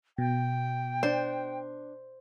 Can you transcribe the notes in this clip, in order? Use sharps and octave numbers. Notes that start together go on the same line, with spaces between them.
B2 G5
D4 C5